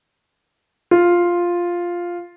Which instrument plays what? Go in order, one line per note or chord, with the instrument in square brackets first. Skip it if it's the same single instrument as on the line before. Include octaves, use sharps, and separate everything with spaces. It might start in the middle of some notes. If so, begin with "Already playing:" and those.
[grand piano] F4